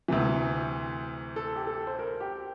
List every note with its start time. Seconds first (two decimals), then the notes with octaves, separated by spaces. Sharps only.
0.08 D2 C3 E3
1.36 A4
1.56 G4
1.67 A4
1.87 C5
1.99 A#4
2.20 G4